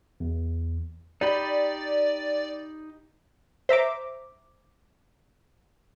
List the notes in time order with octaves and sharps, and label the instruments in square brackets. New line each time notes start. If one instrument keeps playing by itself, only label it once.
[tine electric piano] E2
[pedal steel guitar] D#4 G4 B5 [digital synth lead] D5
[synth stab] C5 E5 A#5 D6